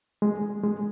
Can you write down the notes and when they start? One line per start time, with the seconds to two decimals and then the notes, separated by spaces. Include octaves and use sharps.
0.22 G#3
0.63 G#3